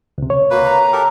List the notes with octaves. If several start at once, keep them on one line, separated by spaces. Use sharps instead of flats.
C#2 C3
C#5
A#3 F#4 B4
A#5
G4 A4 A#4